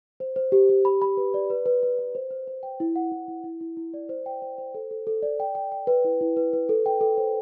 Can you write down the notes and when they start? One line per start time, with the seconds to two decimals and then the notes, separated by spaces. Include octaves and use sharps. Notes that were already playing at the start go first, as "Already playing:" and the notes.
0.20 C5
0.36 C5
0.52 G4
0.69 G4
0.85 B5
1.02 B5
1.17 B4
1.34 D5
1.50 B4
1.66 B4
1.83 B4
1.99 B4
2.15 C5
2.31 C5
2.47 C5
2.63 G5
2.80 E4
2.96 F#5
3.12 E4
3.28 E4
3.44 E4
3.61 E4
3.77 E4
3.94 D5
4.09 C5
4.26 G5
4.42 C5
4.58 C5
4.75 A4
4.91 A4
5.07 A4
5.22 D5
5.40 G5
5.55 G5
5.72 G5
5.87 B4
6.05 E4
6.21 E4
6.37 B4
6.53 B4
6.69 A4
6.86 G5
7.01 A4
7.18 C5